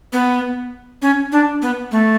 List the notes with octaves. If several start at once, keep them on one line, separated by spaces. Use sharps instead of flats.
B3
C#4
D4
B3
A3